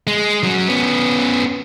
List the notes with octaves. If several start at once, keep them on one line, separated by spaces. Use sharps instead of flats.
G#3
F#2 F#3
B3 C#4